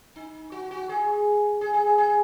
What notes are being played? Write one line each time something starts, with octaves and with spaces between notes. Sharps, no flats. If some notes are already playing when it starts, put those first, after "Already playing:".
D#4
F#4
F#4
G#4
G#4
G#4
G#4
G#4